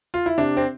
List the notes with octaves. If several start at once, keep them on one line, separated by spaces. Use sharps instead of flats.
F4
E4
C3 D4
C4